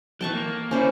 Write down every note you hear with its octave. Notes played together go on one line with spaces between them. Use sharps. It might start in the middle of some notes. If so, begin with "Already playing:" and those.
E3 F#3 G5 A5 C#6
A#3
A#3 C#4 E4 C5 D5